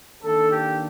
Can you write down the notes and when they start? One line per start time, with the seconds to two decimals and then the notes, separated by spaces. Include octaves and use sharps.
0.23 D#3 A#3 D4 A4
0.52 G4